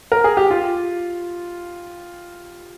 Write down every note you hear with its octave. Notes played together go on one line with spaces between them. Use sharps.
A#4
G#4
G4
F4